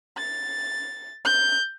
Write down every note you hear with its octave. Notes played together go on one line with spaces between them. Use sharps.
A6
G6